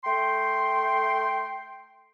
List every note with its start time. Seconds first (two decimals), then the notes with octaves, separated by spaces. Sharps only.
0.04 A3 G5 C6